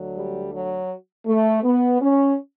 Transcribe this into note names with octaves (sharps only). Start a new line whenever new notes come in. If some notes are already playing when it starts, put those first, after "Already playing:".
Already playing: D2 D3 F#3
G3
F#3
A3
B3
C#4